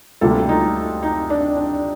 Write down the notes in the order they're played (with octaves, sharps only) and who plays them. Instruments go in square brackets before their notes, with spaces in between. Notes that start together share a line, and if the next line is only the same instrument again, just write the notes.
[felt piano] D2 C3 G3 A#3 F4 A4
D#4
D#4
D4
D4